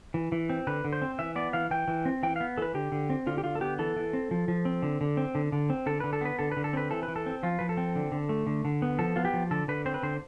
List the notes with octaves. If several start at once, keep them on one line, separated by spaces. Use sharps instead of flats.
E3
E3
C4
D3 B4
D3
C5
C4
E3 E5
B3 D5
E3 F5
E3 G5
E3
C4
E3 G5
F5
B3
E3 A4 B4
D3 G4
D3
C4
D3 F4
G4
D3 F4
A4
B3 G4
E3 A4
E3
C4
F3
F3
C4
D3
D3
C4
D3
D3
C4
D3 A4
D3 B4
A4
B3 B4
D3 A4
B4
D3
A4
C4 B4
E3 A4
B4
E3
A4
C4
F3 F4
F3 B4
A4
C4
D3
D3
A3
D3
D3
B3
F3 A4
B3 F4
G4
F3
D3 A4
D3 B4
C4 C5
B4
D3 C5